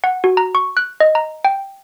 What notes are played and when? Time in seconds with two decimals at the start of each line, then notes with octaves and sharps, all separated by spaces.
0.04 F#5
0.24 F#4
0.37 A#5
0.55 C#6
0.77 F#6
1.00 D#5
1.15 A#5
1.45 G5